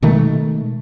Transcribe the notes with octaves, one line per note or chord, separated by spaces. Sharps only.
B2 D#3 G#3 A3